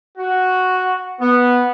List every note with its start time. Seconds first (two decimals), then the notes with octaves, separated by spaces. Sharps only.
0.18 F#4
1.19 B3